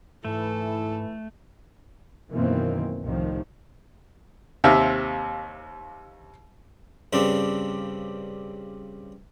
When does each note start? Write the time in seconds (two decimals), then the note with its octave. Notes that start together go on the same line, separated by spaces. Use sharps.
0.25 G#2 E3 A3 E4 A4
2.31 F#2 B2 D#3 E3 A#3 C4
3.03 C2 A2 C3 D#3 F3
4.64 D#2 C3 C4 E5 F5
7.13 G2 C#3 C4 D4